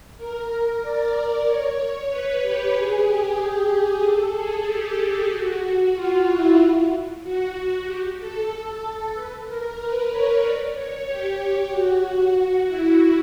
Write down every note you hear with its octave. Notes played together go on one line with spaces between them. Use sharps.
A#4
D5
C#5
B4
G4
G#4
G4
A4
G#4
G4
F#4
F4
E4
F#4
G4
A4
A4
A4
B4
A#4
B4
C#5
D5
C#5
G4
F#4
F#4
E4